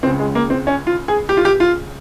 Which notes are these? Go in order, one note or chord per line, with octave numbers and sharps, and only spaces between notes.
C#2 C#3 C4
G#3
A#3
C4
C#4
F4
G#4
G4
F4
G4
F4